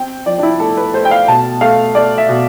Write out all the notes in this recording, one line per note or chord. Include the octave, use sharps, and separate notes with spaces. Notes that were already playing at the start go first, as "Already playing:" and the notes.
Already playing: C4 G5
F3 D5
D4
E4
A3 A4
B4
A3 C5
G5
F5
B2 A5
A3 F5
A3 D5
E5
B2